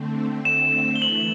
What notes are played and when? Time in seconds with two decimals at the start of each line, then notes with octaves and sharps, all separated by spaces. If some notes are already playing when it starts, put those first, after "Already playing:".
Already playing: D3 A3 C4
0.45 E7
0.96 G7
1.02 E3 A3 F#7